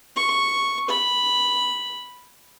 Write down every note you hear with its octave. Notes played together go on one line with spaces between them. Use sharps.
C#6
B5